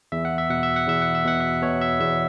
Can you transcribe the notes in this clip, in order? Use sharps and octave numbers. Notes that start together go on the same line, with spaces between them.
E2 E5
F#5
E5
B2 F#5
E5
F#5
E2 E5
F#5
E5
B2 F#5
E5
B2 C#5
E5
E2 E5